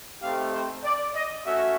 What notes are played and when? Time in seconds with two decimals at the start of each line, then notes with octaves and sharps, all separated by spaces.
0.21 A3 C4 D#4 G4 F5
0.53 C5
0.83 D5
1.15 D#5
1.45 A3 C#4 F#4 E5